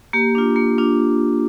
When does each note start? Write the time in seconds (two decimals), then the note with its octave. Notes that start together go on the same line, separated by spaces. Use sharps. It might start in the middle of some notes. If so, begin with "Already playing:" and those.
0.13 A#3 G4
0.35 D4 F4
0.56 A#3
0.78 D4 F4